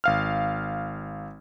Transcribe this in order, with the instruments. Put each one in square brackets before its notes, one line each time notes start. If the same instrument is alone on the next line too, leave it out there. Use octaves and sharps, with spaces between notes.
[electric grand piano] G#1 F5 F6